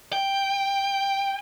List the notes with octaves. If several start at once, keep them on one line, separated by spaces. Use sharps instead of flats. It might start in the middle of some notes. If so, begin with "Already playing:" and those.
G5